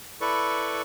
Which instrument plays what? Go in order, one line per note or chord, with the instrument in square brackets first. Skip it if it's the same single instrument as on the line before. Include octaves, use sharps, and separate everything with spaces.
[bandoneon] E4 A4 B4 D5 C#6